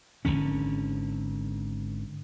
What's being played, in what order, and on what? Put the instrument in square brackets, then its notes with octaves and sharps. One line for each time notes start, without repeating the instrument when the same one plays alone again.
[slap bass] G#1 C#2 D3 C#4